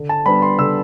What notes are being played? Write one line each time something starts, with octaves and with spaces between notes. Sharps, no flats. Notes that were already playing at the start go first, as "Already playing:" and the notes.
Already playing: D3
A5
G3 B3 D4 B5
C6
D3 E6